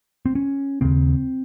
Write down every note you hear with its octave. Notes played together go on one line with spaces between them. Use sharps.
C4
C#4
D#2 C#3 C4